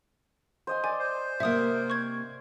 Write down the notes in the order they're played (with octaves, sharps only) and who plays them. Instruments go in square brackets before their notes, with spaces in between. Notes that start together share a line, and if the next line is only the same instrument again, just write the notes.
[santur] C5 D#5 G#5
[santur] D5 A5 D6 [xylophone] G#5
[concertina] C5
[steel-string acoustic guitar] C3 A#3 [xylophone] E5 D#6
[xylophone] C#6 G#6